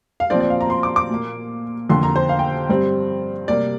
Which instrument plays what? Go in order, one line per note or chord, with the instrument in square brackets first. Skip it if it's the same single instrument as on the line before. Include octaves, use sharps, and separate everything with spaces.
[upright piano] F5
A#2 F3 C4 D5
D5
F5
A#5
C6
D6
D6
A#2 A#3
F2 D3 A#3 C6
A#5
C5
F5
G5
G2 G3 C4
C3 G3 A#3 D5